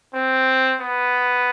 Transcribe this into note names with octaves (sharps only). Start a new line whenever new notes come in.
C4
B3